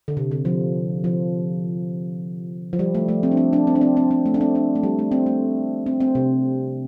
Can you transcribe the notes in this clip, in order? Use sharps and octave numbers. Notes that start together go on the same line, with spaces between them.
D3
C3
D3
F3
F3
F3
G3
A3
A3
C4
D4
C4
D4
C4
D4
C4
C4
C4
A3
D4
C4
D4
A3
G3
A3
C4
A3
C4
C4
C3